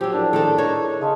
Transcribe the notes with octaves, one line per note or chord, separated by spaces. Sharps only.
F3 F#3 G4 C5 E6
D4 E4 G#4 A#4
D#3 G3 A4
D#4 A4 C#5
C#3 D#5 A5 C6